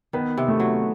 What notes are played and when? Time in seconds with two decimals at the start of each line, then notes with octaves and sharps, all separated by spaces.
0.13 D#3 B3 B4
0.38 C3
0.48 A3 A4
0.60 F#3